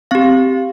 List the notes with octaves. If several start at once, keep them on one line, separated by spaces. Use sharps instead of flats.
C4 G4 F5